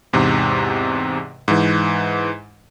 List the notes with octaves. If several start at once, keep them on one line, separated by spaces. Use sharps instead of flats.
E2 G#2 C3
G#2 E3